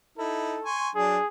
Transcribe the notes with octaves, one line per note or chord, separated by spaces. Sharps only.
D#4 E4 A4
G#5 C6 C#6
F#3 D4 G#4